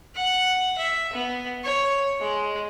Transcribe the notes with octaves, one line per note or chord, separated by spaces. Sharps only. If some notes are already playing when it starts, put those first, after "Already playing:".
F#5
E5
B3
C#5
G#3